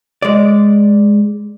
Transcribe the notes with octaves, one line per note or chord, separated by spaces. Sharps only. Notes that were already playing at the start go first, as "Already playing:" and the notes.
G#3 D5